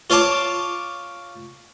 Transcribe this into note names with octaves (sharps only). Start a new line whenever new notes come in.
F4 C#5 F5 A5 D6